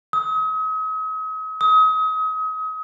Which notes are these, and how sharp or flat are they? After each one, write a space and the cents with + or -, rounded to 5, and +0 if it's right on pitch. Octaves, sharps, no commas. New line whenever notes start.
D#6 +40
D#6 +35